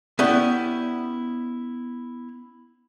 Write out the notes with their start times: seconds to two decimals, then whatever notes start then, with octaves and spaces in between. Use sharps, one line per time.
0.19 B3 C#4 E4 G4 D5